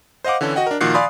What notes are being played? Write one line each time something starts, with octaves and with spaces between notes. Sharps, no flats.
C5 D#5 F5 F#5 D6
D3 E3 C#4 A4
F#4 D#5 F#5 G5
D4 A#4
A#2 D#3 F3 F#4 F#6 C7
D5 F5 G#5 B5 C6 D#6